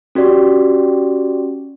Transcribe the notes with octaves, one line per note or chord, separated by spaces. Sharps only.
C#4 F#4 G4 D5